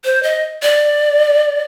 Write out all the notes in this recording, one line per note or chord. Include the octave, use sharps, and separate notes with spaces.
C5
D#5
D5